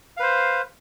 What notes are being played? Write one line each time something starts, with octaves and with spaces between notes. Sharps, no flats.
B4 C5 F5